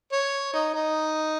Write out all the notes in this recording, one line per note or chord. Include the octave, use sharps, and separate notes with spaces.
C#5
D#4
D#4